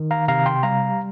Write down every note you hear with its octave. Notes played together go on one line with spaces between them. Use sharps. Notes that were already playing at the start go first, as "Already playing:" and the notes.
Already playing: D#3
F5 A#5
C3 F5 A#5
G5 C6
G3 F5 A#5